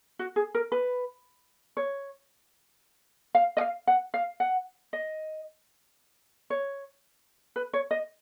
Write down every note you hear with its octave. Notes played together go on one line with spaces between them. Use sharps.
F#4
G#4
A#4
B4
C#5
F5
D#5
F5
F#5
F5
F#5
D#5
C#5
B4
C#5
D#5